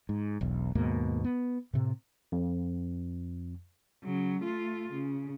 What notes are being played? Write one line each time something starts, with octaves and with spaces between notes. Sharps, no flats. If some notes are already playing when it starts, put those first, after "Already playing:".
G#2
E1 B1
D#2 G#2 B2 A#3
B3
A2 C3
F2
C#3 F#3
A3 F4
C#3